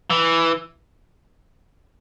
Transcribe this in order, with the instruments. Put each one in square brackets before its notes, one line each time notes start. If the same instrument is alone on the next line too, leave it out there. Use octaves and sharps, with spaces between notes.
[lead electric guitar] E3